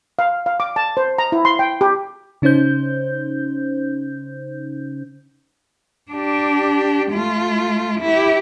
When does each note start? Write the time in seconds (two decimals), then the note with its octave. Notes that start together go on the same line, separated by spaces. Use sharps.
0.19 F5
0.46 F5
0.60 D6
0.76 A5
0.97 C5
1.18 A#5
1.32 E4
1.45 C6
1.59 G5
1.81 G4
2.42 C#3 C#4 D#4 C5 G6
6.12 D4 G4
7.11 A3 F4
8.01 E4 G4